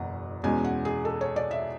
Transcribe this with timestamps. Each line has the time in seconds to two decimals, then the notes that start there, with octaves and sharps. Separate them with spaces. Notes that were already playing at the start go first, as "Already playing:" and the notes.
Already playing: F#1 E2 B2 F#5
0.44 E2 B2 G#3 C#4 G#5
0.65 F#5
0.85 G#4
1.05 A4
1.21 C#5
1.36 D5
1.51 E5